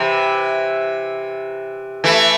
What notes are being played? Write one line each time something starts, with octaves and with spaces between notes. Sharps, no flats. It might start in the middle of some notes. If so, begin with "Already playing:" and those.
Already playing: C3 E3
E3 A3